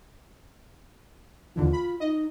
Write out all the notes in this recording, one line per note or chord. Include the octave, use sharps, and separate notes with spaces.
D#2 D3 E3 F4
B5
D#4 D#5